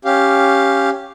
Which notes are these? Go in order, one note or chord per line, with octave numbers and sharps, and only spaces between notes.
C#4 G4 F5